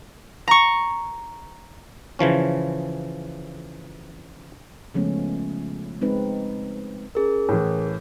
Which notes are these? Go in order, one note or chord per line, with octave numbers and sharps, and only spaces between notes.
A#5 C#6
C#3 E3 F3 C#4
C#3 F3 G#3 A3 B3 C#4
G#3 C4 D#4 B4
C#4 G#4 A#4
A2 E3